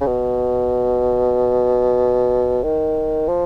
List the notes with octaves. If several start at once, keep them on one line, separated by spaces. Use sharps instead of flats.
C#3
B2
D#3
F3